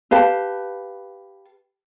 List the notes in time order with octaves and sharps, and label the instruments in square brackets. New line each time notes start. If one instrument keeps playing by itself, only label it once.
[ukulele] G4 B4 F5 A5